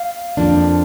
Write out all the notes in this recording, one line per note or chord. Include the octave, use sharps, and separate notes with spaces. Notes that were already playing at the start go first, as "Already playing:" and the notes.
Already playing: F5
F2 F3 A#3 D4